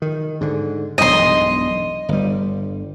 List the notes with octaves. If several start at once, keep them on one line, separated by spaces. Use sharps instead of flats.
D#3
G#2 D3
E1 B1 G2 D#5 C6
G1 G3